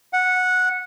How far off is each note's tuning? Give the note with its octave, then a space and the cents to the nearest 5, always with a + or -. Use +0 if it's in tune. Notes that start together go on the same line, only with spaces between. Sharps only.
F#5 -10